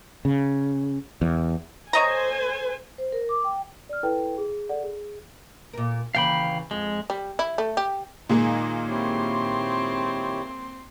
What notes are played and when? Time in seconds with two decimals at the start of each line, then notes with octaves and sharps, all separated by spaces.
0.25 C#3
1.21 E2
1.93 A4 C5 C#5 D#5 G#5 A#5
2.98 C5
3.12 A#4
3.29 D6
3.44 G5
3.89 D5 F6
4.03 E4 A4 B4 G5
4.38 G#4
4.69 A4 D5 F#5
4.83 G#4
5.73 A#2 A#4
6.15 D#2 C#3 E3 F5 G5 B5
6.71 F2 G#3
7.10 G3
7.39 E4
7.58 A3
7.77 G4
8.29 A#2 D#3 G#3 A#3 D#4 G#4
8.88 C4 E4 G4 C#5 C6